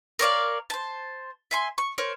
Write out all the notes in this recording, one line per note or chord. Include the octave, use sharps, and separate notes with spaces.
A#4 C#5 D5 F5
C5 A5
E5 G#5 C6
C#6
A#4 C5 C#5